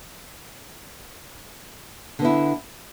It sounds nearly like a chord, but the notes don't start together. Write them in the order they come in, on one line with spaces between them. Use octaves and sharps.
D3 B3 E4